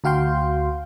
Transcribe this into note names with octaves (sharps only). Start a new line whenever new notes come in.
D2 F#4 F5 G5 C6